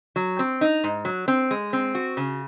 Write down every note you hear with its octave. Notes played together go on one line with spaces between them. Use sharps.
F#3
C4
D#4
G#2
F#3
C4
G#3
C4
F#4
C#3